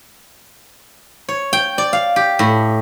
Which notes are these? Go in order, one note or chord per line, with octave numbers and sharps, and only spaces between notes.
C#5
G5
D5
F5
G4
A2